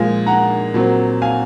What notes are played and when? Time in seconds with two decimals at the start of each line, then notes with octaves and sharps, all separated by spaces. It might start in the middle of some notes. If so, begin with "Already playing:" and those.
Already playing: A#2 F3 G#3 F5 G#5
0.26 F#5 A#5
0.74 A#2 F#3 C4
1.22 F5 G#5